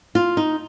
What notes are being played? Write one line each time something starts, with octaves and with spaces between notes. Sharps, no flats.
F4
D#4